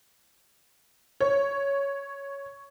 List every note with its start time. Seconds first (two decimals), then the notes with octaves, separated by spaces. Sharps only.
1.21 C#5